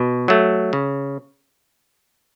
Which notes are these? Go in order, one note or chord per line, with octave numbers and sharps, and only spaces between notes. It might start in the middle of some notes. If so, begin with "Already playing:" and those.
Already playing: B2
F#3 A3
C#3